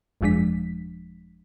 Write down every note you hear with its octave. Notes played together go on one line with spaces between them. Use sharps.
G1 F2 F3 G#3 D4 B6